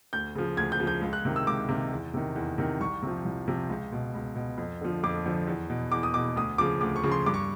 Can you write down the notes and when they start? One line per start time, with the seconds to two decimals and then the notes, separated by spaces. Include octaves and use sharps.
0.13 D2 G6
0.35 C#3 F3
0.57 D2 G#6
0.72 G6
0.80 C#3 F3
0.87 G6
1.01 C#2
1.13 F#6
1.25 C3 D#3
1.36 E6
1.47 C#2 D6
1.69 C3 D#3
1.92 E2
2.14 C3 D#3
2.36 E2
2.58 C3 D#3
2.80 C2 C#6
3.02 C3 F3
3.25 C2
3.48 C3 F3
3.69 C#2
3.92 B2
4.15 C#2
4.36 B2
4.58 F2
4.81 D3 F3
5.04 F2 D6
5.26 D3 F3
5.48 E2
5.70 B2
5.92 E2 D6
6.03 D#6
6.14 B2 D6
6.36 D2 D#6
6.58 C#3 F3 D6
6.81 D2 D6
6.96 C#6
7.03 C#3 F3
7.12 C6
7.26 G2 D6
7.34 C#6